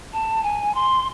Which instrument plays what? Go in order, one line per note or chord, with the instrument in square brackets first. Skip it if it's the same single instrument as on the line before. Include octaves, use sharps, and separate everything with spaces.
[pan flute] A5
G#5
C6